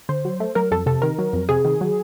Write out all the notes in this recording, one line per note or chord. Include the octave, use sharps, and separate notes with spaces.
D3 C5
F#3
A3
F#3 A#4
F2 A4
C3 A4
D#3 A#4
F#3
F2
C3 G#4
D#3
F#3